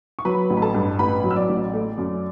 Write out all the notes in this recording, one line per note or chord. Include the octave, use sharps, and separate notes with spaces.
C#6
F#3 B4 B5
A1
B5
A4 A5
G2
A1 B4 B5
F#3
E6
D5 D6
A1
A3
F#2